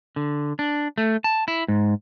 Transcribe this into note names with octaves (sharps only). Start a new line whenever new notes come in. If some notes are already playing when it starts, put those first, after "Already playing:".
D3
D4
A3
A5
E4
G#2